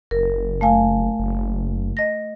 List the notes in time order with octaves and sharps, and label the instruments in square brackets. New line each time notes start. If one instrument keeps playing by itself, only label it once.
[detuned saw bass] F#1 [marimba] A#4
[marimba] A3 F5 G#5
[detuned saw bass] F#1
[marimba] D#5 A#6